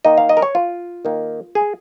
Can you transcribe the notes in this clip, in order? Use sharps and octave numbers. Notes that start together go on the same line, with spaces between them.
D#3 A#3 D#4 D#5
F5
D#5
A#4
C#5
F4
D#3 A#3 D#4
G#4